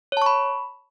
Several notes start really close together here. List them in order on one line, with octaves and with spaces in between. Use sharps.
C#5 A5 C#6 B5